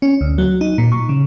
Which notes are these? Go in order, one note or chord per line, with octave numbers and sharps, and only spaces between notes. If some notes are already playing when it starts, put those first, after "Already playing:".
C#4
D2
F#3
D#4
A#2
C#6
C#3